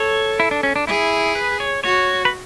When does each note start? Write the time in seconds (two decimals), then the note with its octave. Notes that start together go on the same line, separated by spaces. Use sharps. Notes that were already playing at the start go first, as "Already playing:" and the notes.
Already playing: A4 C#5
0.40 E4
0.51 D4
0.63 C#4
0.76 D4
0.87 E4 G#4
1.35 B4
1.60 C#5
1.84 F#4 C#5
2.25 B4